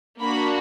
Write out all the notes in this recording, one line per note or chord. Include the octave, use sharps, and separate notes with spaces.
A#3 D4 F#4 B5